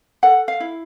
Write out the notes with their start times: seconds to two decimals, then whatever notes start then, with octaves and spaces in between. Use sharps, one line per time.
0.23 A4 F#5
0.48 F5
0.60 E4